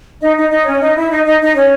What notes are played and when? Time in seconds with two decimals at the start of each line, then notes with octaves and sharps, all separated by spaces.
0.21 D#4 D#5
0.36 D#4 D#5
0.50 D#4 D#5
0.65 C#4 C#5
0.80 D#4 D#5
0.96 E4 E5
1.11 D#4 D#5
1.26 D#4 D#5
1.40 D#4 D#5
1.55 C#4 C#5